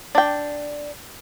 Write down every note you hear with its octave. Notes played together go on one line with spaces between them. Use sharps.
D4 G5